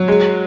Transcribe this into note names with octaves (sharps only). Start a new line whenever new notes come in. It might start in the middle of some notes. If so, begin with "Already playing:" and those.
Already playing: F#3
G#3